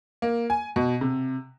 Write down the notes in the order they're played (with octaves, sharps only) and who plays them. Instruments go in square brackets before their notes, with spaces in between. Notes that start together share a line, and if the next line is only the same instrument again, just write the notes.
[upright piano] A#3
G#5
B2
C3